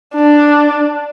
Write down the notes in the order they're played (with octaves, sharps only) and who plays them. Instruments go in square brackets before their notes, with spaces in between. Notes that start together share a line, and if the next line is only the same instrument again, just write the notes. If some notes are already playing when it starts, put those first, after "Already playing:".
[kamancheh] D4